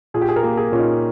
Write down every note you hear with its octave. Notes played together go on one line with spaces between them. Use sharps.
A#2 G#4
G4
G#4
A#4
A#3
G#4
A#2 C#4
D#4